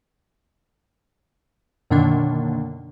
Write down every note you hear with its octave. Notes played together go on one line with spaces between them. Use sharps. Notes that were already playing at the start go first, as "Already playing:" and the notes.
F#2 B2 D3 D#3 A#3 D4